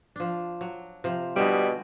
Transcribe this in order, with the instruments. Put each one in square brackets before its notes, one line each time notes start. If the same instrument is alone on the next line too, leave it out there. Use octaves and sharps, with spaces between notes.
[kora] F3 D4
F#3
C3 F3
[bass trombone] B2 [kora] D3 G#3 [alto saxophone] G3